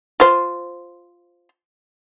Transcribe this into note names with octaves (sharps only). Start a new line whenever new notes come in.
F4 C5